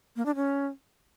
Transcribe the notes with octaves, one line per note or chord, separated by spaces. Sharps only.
A#3
D4
C#4